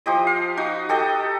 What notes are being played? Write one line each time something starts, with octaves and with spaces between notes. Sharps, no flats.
F3 G4 D#5
F5
D#4 F#4
G4 A4 D#5 G5